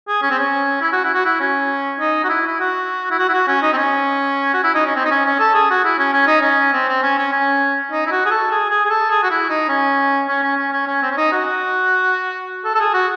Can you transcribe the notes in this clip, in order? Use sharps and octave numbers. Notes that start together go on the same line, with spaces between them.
G#4
C#4
C4
C#4
E4
F#4
E4
F#4
E4
C#4
D#4
F#4
E4
E4
F#4
E4
F#4
E4
F#4
C#4
D#4
C4
C#4
F#4
E4
D#4
C#4
C4
D#4
C#4
C#4
A4
G#4
F#4
E4
C#4
C#4
D#4
C#4
C4
C4
C#4
C#4
C#4
D#4
E4
F#4
G#4
A4
G#4
G#4
G#4
A4
G#4
F#4
E4
D#4
C#4
C#4
C#4
C#4
C#4
C#4
C4
C#4
D#4
F#4
A4
A4
G#4
F#4